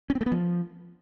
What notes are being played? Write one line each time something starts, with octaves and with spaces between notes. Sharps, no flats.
C#4
C4
A3
B3
F3